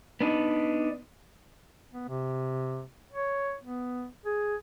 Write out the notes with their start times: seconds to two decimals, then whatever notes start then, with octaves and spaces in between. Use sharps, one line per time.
0.21 B3 D4 D#4
1.93 B3
2.09 C3
3.12 C#5
3.64 B3
4.26 G#4